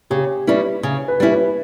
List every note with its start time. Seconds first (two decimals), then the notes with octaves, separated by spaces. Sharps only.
0.10 C#3 G4
0.47 G3 C#4 E4 B4
0.83 C#3
1.08 B4
1.20 G3 C#4 E4
1.32 B4